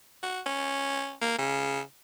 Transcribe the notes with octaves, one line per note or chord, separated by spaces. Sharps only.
F#4
C#4
A#3
C#3